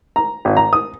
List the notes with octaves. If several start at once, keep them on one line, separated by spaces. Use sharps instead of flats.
A#5
G#1
A#5
D#6